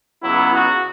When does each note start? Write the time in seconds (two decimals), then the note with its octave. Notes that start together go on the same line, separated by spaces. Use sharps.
0.23 C#2 C#3 F#3 B3 E4
0.55 F#4